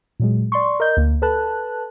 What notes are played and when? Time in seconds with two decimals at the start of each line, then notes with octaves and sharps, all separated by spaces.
0.20 A#2 F#3 G#3
0.52 D5 C6 C#6
0.80 A#4 D#5 G6
0.97 D2 A#3
1.22 A4 B4 A5 F#6